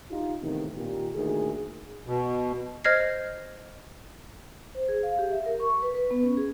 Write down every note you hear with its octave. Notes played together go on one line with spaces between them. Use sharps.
D#4 F4 G4
E2 A2 C3 D#3
A#2 D#3 G4
D2 A#2 D#3 G#4
B2
C5 D#5 F6 G#6 A#6 C7
C5
G#4
F5
G4
E5
A#4
C#6
B4
B4
B3
C#4
G#4